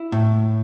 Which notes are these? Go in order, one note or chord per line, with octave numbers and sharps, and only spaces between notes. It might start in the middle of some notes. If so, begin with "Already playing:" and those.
Already playing: E4
A2